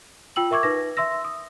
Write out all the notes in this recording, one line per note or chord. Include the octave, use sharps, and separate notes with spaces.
F4 G5 E6 F#7
A#4 E5 C#6 D6 G#6
D#4 B4 A#6
E5 C6 E6 A#6
D#6